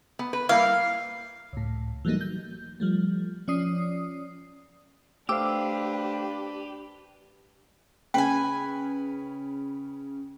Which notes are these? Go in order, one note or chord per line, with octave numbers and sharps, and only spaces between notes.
B3
B4
G3 A#3 E4 F5
C#2 A2
E3 F#3 G3 A3 A#3 D#4
G6
F3 G3 A3
F3 C#4 D5 D#6 C7
A3 D4 G4 B4 C5 F5 D6 E6
C#3 C#4 B4 G5 G#5